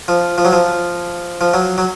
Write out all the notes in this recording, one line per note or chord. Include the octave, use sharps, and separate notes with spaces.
F3
F3
F#3
F3
F3
F#3
F#3